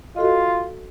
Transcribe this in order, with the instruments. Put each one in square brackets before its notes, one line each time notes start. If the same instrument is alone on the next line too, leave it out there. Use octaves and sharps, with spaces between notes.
[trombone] F4 [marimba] F#4 A4 D#5